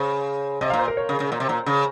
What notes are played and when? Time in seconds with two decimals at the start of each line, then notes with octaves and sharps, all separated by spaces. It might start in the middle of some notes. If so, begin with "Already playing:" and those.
Already playing: C#3 C5
0.61 C3 D#5
0.70 F5
0.73 A#2
0.79 C5
0.88 A#4
0.97 C#5
1.09 C#3
1.20 C#3
1.32 A#2
1.40 C3
1.49 A#2
1.66 C#3